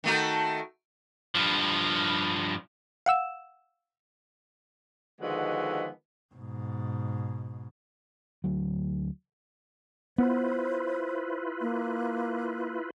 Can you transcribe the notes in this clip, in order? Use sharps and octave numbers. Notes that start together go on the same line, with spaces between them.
D#3 A3 F#4
G2 F3
F5 F#5 E6 E7
D3 D#3 F3 G#3 B3 F#4
G#2 B2
D2 F#3
B3 E4 F4 B4 C5
A#3